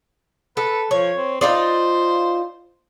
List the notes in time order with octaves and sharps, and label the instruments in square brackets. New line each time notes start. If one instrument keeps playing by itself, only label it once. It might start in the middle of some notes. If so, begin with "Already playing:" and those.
[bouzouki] A4 [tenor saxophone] B4
[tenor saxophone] F3 [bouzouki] C#5
[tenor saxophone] C4
[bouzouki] D#4 F4 D5 [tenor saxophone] C5